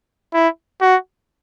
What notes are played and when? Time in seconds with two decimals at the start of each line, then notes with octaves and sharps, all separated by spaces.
0.34 E4
0.81 F#4